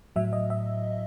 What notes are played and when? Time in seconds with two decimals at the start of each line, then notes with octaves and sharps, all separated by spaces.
0.16 A2 F#3 E5
0.33 D#5
0.50 E5